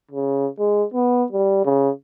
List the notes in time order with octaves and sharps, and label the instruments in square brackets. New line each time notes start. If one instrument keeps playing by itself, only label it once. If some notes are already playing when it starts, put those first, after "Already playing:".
[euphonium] C#3
G#3
B3
G3
C#3